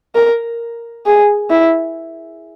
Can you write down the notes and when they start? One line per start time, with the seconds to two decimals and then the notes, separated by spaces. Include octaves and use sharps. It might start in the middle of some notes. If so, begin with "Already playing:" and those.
0.15 A#4
1.06 G#4
1.50 E4